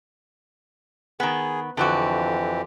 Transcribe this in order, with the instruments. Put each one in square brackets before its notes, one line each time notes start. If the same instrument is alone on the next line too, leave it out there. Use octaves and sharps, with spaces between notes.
[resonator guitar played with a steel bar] D#3 B3 [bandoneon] G#4
[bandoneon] F2 E3 G4 [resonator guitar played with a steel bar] D3 F#3 F#4